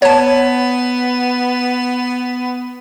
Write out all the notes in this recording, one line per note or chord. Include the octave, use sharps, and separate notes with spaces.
B3 C#5 A5